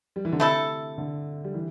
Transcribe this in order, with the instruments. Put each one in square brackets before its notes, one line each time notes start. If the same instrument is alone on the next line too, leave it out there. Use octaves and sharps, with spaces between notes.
[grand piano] G3
E3
D3
[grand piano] C3 [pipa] A3 E4 A4
[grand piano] D3
G3
E3